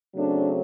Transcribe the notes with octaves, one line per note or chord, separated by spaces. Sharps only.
C#3 F#3 A3 C4 D4